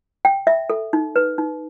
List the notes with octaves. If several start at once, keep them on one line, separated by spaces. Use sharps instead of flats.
G5
E5
A4
D#4
B4
D#4